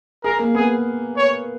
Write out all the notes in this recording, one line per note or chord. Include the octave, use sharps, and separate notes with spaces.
G#4 A#4
A#3
B3 G#4
C#5